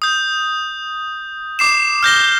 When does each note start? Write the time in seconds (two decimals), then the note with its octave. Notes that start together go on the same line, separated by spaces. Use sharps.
0.02 D#6 G6
1.59 D6 C7 E7
2.03 F6 G6 A#6 G7